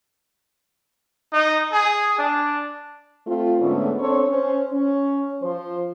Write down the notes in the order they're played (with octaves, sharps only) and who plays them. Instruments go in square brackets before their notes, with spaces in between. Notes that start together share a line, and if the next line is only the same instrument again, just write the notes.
[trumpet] D#4
G#4
D4
[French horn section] A3 C4 F4
G#2 D3 A3 B3 C#4
C4 D4 A4 C5 C#5
C#4 C5
C#4
F3 C5